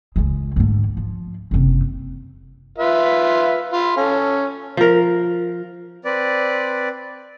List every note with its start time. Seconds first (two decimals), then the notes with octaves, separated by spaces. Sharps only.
0.16 C#2 G#3
0.56 G#2 D3
0.97 F3
1.51 F#1 C3
2.78 F4 B4 E5
3.72 F4 B5
3.97 C#4 A4
4.77 F3 A#4
6.05 C4 B4 D5